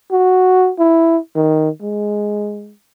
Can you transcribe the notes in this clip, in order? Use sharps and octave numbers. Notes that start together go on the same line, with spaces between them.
F#4
E4
D#3
G#3